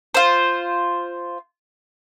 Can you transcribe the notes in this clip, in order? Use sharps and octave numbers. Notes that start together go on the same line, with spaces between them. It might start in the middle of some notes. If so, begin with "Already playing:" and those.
F4 C5